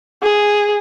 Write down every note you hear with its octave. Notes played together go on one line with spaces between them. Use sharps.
G#4